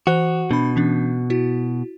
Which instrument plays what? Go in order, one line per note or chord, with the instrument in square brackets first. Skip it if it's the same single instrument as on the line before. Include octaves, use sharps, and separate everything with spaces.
[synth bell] E3 C5 F#6 [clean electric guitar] F#4
[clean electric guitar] B2 [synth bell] D4 B5
[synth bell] E3 C#4 D4
E4 F#4